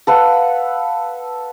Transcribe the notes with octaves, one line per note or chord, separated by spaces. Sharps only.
A4 B4 F5 F#5